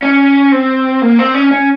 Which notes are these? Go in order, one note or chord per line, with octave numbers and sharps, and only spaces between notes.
C#4
C4
A#3
C4
C#4
C#4